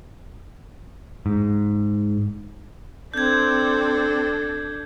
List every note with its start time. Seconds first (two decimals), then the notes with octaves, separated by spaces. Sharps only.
1.26 G#2
3.14 C4 D4 A4 G6 G#6